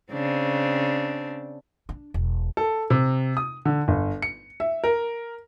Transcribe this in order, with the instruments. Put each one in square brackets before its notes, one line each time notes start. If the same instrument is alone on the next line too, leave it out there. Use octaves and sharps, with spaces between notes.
[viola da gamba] C#3 C4 D4
[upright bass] D4
E1
[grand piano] A4
C3
D#6
D3
G1
C#7
E5
A#4